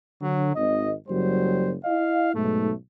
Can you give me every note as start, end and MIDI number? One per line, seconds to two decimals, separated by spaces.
0.21 0.51 50
0.21 0.51 54
0.55 0.91 32
0.55 0.91 75
1.08 1.72 30
1.08 1.72 54
1.08 1.72 55
1.08 1.72 72
1.84 2.33 64
1.84 2.33 75
1.84 2.33 77
2.34 2.71 35
2.34 2.71 44
2.34 2.71 57